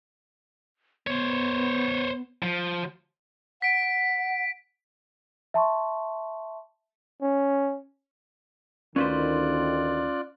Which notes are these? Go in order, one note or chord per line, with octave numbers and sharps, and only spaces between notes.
B3 C5 C#5
F3
F#5 B6 D7
E5 A5 C6 C#6
C#4
D2 D#3 C#4 F4 B4 C5 D5 F#6